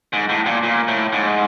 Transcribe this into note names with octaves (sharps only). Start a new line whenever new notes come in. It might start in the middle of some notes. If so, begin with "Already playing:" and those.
G#2
A2
A#2
A#2
A2
G#2